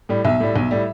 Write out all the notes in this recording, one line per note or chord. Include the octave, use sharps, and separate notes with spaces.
A2 G3
B1 E5
A2 G3
B1
A2 G3